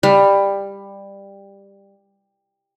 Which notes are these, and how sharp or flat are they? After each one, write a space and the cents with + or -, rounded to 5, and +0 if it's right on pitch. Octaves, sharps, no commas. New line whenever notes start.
G3 +15